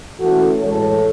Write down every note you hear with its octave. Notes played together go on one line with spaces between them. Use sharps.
E3 A3 C#4 F#4 A4
A2 E3 G#3 A4 C#5